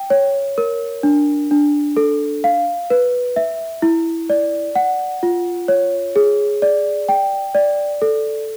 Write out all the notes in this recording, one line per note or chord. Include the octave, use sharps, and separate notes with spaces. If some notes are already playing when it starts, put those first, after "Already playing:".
Already playing: G5
C#5
A#4
D4
D4
A4
F5
B4
E5
E4
D5
F#5
F4
C#5
G#4
D5
G5
D5
A4